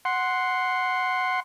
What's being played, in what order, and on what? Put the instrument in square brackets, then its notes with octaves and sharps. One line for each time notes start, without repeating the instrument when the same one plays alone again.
[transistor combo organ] F#5 C6